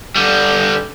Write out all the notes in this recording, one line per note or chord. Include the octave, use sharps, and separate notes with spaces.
D3 G3